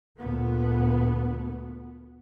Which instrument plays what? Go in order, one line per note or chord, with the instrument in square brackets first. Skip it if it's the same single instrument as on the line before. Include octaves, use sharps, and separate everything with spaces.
[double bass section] D2 A#2 B3